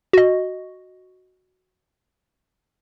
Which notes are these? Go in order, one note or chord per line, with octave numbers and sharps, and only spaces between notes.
F#4 D#5